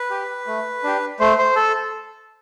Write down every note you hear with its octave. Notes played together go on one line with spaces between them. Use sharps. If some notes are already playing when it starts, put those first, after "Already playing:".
Already playing: B4
G4
A3
D4 G4
A3 C5
C5
A4